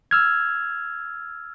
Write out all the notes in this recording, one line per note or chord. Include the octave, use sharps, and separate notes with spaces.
E6 F6 G#6